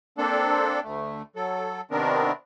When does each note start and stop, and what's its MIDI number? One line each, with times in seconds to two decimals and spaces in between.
0.18 0.80 58
0.18 0.80 60
0.18 0.80 62
0.18 0.80 69
0.84 1.22 38
0.84 1.22 57
1.36 1.81 54
1.36 1.81 69
1.91 2.32 48
1.91 2.32 51
1.91 2.32 59
1.91 2.32 60
1.91 2.32 62
1.91 2.32 70